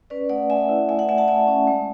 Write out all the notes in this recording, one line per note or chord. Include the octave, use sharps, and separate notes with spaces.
C#4 B4 D5
A3 D5 F#5
A3 E5 G#5
E4
A3 E5 G#5
D5 F#5
A3 E5 G#5
F#5 A5
A3 E5 G#5
C#4
G#3